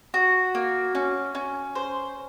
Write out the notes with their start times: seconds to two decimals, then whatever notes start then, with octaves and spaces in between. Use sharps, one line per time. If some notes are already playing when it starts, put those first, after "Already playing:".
0.14 F#4
0.55 A#3
0.95 C#4
1.35 C#4
1.76 C5